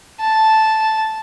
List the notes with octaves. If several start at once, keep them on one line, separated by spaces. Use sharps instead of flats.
A5